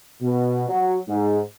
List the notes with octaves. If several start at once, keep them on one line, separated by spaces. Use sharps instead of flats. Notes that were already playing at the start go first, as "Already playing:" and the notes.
B2
F#3
G#2